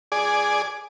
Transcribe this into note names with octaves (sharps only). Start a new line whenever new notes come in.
G#4 D5